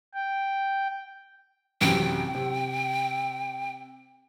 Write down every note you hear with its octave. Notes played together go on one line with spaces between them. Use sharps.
G5
A1 F#2 C3 G5
C3